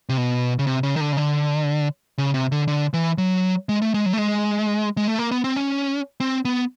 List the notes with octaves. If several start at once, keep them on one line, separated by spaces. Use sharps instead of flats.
C3
B2
C#3
C3
C#3
D#3
D3
C#3
D3
C#3
C3
D3
D3
E3
F#3
G#3
A3
G#3
F#3
A3
G#3
G#3
A3
A#3
B3
C4
C#4
C4
B3